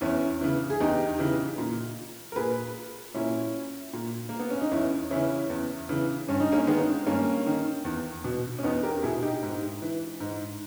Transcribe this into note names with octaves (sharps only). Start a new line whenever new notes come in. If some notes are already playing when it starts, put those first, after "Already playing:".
E2 C#4 E4
C#3 E3
G#4
E2 D#4 G4
C#3 E3
A#2
A#4
A#2 G#4 B4
A#2 C#4 E4
A#2
A#3
B3
C#4
D#4
E2 C#4 E4
C#3 E3 C#4 E4
E2
C#3 E3
G2 C#4
D#4
A#3 C#4
D#3 G#3 B3
G2 A#3 C#4
D#3
E2
B2
C#4
E2 B3 D#4
G4 A#4
B2 E4 G#4
D#4 G4
G#2
E3
G#2